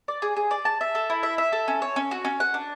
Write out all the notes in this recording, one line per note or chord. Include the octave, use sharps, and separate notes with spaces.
D5
G#4
G#4
D5
A5
E5
A4
E4
E5
E5
A4
C#4
C#5
C#4
F#4
C#4
F#5
D4